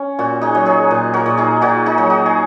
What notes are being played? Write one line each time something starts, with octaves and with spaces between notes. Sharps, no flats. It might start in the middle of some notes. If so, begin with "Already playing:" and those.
Already playing: C#4
A#2 F#4
D#4 G#4
F#3 D#5
G#4 C#5
A#2
F#4 A#4
A#2
D#4 G#4
A#2 F#4
D#4 G#4
F#3
F#4
G#4